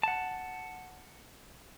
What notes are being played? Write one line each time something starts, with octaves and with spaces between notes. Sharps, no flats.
F#5 A5